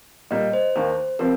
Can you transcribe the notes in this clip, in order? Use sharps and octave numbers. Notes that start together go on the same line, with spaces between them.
A#2 G3 A#3 D#5
C5
D#2 D#3 A#3
C3 F3 C4 A#4